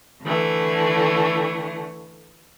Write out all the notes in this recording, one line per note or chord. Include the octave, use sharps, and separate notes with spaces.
D3 E3 A3